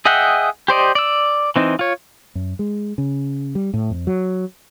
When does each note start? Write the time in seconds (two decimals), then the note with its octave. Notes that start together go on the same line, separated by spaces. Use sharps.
0.05 G#4 D#5 E5 F#5 G5
0.68 G4 C5 D5 D#5
0.95 D5 E6
1.56 E3 C4 D#4
1.79 F4 C#5
2.35 F#2
2.59 G#3
2.98 C#3
3.55 G3
3.74 A2
3.90 F2
4.07 F#3